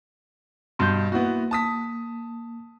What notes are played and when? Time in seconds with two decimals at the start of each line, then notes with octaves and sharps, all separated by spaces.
0.79 G2 B2 C6 G6
1.12 A#3 B3 E4 F#4
1.51 A5 D#6 B6